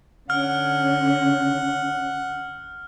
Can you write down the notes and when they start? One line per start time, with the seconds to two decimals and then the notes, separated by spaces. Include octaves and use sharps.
0.30 D3 C#4 F#5 F6